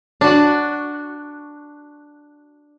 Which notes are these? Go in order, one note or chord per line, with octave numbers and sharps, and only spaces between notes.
D4 F#4